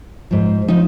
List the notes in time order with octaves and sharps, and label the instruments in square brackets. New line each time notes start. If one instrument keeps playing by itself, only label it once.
[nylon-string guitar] G#2 F3
F3 D#4